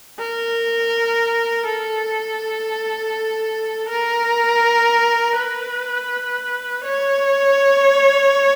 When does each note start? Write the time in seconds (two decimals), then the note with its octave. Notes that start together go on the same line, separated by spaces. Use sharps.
0.19 A#4
1.66 A4
3.89 A#4
5.36 B4
6.84 C#5